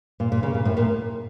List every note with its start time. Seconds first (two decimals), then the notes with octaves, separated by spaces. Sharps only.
0.20 A#2
0.32 A#2
0.43 C#3
0.54 A#2
0.65 A2
0.77 A#2